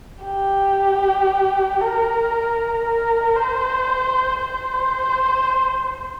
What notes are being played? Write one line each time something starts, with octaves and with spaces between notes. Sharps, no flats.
G4
A#4
A#4
C5
C5